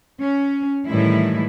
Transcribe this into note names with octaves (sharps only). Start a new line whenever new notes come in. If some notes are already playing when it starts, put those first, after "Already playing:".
C#4
A2 D#3 E3 G3 G#3 E4